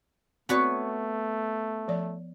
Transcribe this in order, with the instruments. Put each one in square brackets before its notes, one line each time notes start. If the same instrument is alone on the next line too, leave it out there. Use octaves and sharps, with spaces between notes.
[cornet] A3 [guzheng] B3 B4 C#5 [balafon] C4 F#4 D5
[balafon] F3 D5